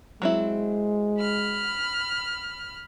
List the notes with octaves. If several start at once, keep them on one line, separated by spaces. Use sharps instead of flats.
F#3 G#3 C4 E4
B5 F6